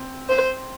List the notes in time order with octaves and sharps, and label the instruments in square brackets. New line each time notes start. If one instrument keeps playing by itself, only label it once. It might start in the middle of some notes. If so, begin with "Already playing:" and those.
Already playing: [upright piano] C4
[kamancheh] C5